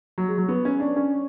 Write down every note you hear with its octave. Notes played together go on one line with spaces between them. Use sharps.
F#3
G#3
F#3
B3
C#4
D4
C#4